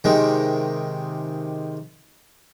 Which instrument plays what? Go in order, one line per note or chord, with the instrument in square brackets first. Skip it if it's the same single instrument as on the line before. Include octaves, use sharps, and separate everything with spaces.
[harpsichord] C3 D#3 G#3